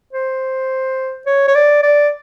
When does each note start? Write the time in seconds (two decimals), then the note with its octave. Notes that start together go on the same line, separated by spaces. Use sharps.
0.13 C5
1.26 C#5
1.48 C#5
1.55 D5
1.83 D5